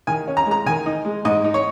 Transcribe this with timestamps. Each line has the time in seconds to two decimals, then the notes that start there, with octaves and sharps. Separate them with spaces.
0.07 D#3 G#5
0.27 C#4
0.37 A#5
0.46 G#3
0.51 A#5
0.66 D#3 G#5
0.86 D#4
1.05 G#3
1.25 G#2 D#5
1.44 D#4
1.54 C#5